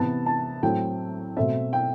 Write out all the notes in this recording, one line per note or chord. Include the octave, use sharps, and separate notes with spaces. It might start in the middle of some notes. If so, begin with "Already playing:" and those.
Already playing: C3 E3 B3 A5
A5
A2 F#3 A3 C4 G5
B2 A3 C4 E5
G5